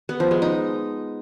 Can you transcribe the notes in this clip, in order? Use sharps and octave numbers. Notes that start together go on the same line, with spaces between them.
B3
F3
G#3
D#4